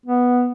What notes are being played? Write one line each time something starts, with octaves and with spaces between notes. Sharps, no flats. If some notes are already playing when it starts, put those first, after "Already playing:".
B3